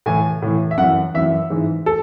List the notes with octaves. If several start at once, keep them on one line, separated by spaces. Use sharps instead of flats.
A2 E3 G#5
A2 E3
E5
F#2 E3 F#5
F#2 E3 E5
G#2 E3
A4